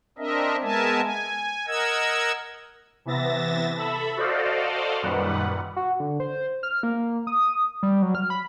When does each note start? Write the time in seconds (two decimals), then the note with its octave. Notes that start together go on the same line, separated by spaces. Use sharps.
0.18 C4 D4 A#4 D#5 E5
0.63 G#3 B3 A#4 E5 G#5 A5
1.02 G#5
1.67 A#4 D#5 F#5 E6 G#6
3.05 C3 E3 B3 E5 A6 A#6
3.77 A4 E5 B5 E6
4.17 F#4 A4 C5 D5 D#5 F5
5.02 F#2 A#2 D#3 G3 B4 F#5
5.76 F#4
6.00 D3
6.20 C5
6.63 F6
6.83 A#3
7.27 D#6
7.83 G3
8.02 F#3
8.15 F6
8.30 B5